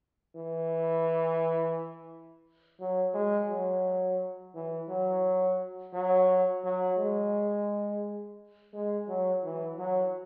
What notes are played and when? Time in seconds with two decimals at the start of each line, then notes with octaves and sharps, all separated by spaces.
0.36 E3
2.80 F#3
3.14 G#3
3.50 F#3
4.55 E3
4.89 F#3
5.93 F#3
6.65 F#3
6.98 G#3
8.74 G#3
9.08 F#3
9.44 E3
9.78 F#3